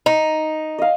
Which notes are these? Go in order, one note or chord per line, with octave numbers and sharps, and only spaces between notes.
D#4
D#5 F5